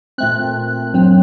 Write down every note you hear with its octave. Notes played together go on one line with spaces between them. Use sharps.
A#2 A3 C4 F#6
G2 F#3 C4